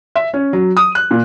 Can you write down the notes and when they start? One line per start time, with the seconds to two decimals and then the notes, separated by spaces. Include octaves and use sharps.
0.16 E5
0.34 C#4
0.53 F#3
0.77 D#6
0.95 F#6
1.11 A#2